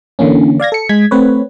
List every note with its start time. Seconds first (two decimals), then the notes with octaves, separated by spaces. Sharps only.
0.19 D3 E3 A#3 C#4
0.60 D5 F5 G#6 A#6
0.72 A4 C#7
0.89 G#3 G#6 B6
1.11 A3 C4 B4 C#5